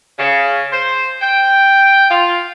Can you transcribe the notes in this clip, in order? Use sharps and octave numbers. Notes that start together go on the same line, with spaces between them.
C#3
C5
G5
F4